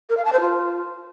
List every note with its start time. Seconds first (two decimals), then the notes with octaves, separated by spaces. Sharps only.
0.09 A#4
0.17 F5
0.25 A5
0.32 C5
0.40 F4